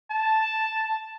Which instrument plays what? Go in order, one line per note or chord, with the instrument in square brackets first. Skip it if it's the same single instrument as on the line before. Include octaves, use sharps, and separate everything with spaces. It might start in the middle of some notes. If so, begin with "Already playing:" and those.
[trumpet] A5